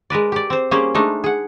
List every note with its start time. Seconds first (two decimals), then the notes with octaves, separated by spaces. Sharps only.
0.10 G#3 A#4 B4 D5
0.32 G4 D5
0.50 C4 C5
0.71 G3 A#3 C#4 G4 G#4 C5
0.95 G#3 A3 D4 D#4
1.24 G#4 F#5